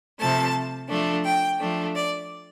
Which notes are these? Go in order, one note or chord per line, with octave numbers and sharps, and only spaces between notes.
C3 F3 A3 A5
F3 A3 D4
G5
F3 A3 D4
D5